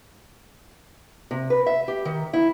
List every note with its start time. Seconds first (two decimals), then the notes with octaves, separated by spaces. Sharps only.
1.31 C3
1.50 B4
1.66 E5
1.88 G4
2.05 D#3
2.33 E4